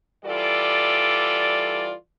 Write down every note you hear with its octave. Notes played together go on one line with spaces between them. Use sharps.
E3 G3 F4 A4 D5